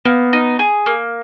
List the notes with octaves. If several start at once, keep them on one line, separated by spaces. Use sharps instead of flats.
A#3 B3
D#4
G#4
A#3